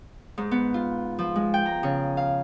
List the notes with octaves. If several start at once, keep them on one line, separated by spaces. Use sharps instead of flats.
G#2
B3
F4
F3
G#3
G5
A#5
C#3
F5